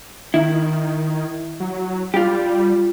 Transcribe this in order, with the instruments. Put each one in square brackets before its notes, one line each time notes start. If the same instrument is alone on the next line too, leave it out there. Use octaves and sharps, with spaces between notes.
[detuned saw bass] D#3 [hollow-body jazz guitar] E4
[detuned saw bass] F#3
[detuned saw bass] G3 [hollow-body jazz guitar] F4 G4